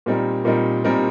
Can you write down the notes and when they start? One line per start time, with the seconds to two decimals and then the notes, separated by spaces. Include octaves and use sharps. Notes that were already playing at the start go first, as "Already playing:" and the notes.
0.06 A#2 G3 C4 D#4 A#4
0.45 A#2 G3 C4 D#4 A#4
0.84 A#2 G3 C4 D#4 A#4